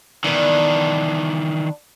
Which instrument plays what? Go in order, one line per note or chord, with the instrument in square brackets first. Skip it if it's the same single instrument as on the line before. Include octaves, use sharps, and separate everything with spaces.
[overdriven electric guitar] D#3 E3 [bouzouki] B3 D4